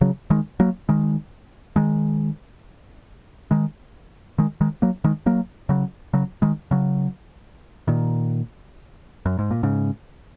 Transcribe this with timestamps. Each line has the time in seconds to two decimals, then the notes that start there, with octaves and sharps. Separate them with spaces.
0.01 C#3 F#3
0.30 D#3 G#3
0.60 F#3 A#3
0.89 D#3 G#3
1.76 D#3 G#3
3.51 D#3 G#3
4.38 D#3 G#3
4.61 D#3 G#3
4.82 F#3 A#3
5.04 D#3 G#3
5.26 F#3 A#3
5.69 C#3 F#3
6.13 C#3 F#3
6.42 D#3 G#3
6.71 C#3 F#3
7.88 A#2 D#3
9.26 F#2
9.39 G#2
9.51 A#2
9.63 G#2 C#3